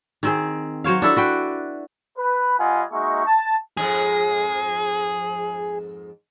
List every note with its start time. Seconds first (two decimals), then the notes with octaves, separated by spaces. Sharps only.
0.23 D#3 C4 G#4
0.84 F#3 C5 C#5 F5
1.02 D4 E4 A4
1.16 F#4 B4 G5
2.18 B4
2.59 G3 F4 D#5 F#5 G#5
2.92 G#3 A#3 D#4 F#4 E5 C#6
3.26 A5
3.77 F2 G#2 G#3 G#4